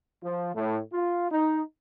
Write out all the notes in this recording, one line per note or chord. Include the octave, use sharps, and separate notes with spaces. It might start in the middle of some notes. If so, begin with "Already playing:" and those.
F3
A2
F4
D#4